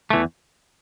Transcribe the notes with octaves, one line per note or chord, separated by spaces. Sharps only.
E2 E3 A3